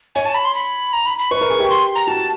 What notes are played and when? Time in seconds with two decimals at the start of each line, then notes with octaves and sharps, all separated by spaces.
0.15 C#5 G#5
0.25 A5
0.34 B5
0.45 C6
0.54 B5
0.93 A#5
1.06 B5
1.19 B5
1.31 B4 C#6
1.41 A#4
1.50 G#4
1.60 G4
1.70 C6
1.95 A#5
2.07 F#4 A5